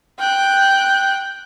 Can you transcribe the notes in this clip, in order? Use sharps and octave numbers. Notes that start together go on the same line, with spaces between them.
G5 F#6